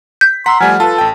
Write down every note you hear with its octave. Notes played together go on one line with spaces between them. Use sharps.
G6 B6
F#5 A#5 C6 E6 B6
F3 G3 A3 F#5 G#5 F6
F4 A4 B4 A5
A1 G5